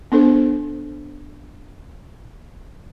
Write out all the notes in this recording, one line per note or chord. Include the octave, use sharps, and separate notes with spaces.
B3 D4 A4 C5